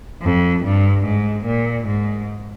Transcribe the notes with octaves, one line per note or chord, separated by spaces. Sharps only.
F2
G2
G#2
A#2
G#2